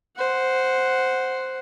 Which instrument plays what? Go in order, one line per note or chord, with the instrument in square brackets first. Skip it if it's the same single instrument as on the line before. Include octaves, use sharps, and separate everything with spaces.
[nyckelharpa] C5 F#5